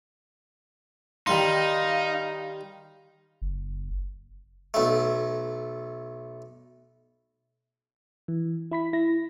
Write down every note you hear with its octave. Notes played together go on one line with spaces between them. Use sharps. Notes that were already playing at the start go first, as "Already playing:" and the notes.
D#3 G3 D#4 F5 C6
F#1
B1 A3
E3
E4 B5 B6
E4 A#6